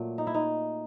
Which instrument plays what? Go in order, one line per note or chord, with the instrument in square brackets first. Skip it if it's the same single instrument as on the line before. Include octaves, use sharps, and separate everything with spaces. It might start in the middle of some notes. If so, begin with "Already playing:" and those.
Already playing: [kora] A#2 F#3 A3
D#4
E4
D#4